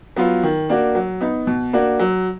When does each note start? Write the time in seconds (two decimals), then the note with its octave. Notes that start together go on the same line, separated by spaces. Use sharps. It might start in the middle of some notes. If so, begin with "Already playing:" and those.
0.16 F#3 B3 F4
0.43 D#3
0.69 A#3 D4 F#4
0.95 F#3
1.21 B3 D#4
1.47 B2
1.73 A#3 D4 F#4
1.99 F#3